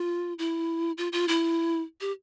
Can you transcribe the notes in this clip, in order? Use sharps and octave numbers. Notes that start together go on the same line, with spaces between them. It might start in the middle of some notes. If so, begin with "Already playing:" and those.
Already playing: F4
E4
F4
F4
E4
G4